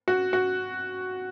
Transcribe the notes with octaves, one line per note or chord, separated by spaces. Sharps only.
F#4
F#4